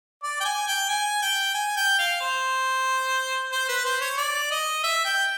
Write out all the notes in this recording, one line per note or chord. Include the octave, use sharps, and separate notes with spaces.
D5
G5
G#5
G5
G#5
G5
G#5
G5
F5
C5
C5
B4
C5
C#5
D5
D#5
E5
G5